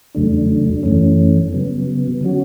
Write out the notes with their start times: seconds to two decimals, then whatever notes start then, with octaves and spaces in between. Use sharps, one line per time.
0.15 E2 C#3 F#3 A3 D4
0.83 F#2 E3 A3 C#4
1.53 C#3 F#3 B3
2.21 D3 F#3 C#4 F#4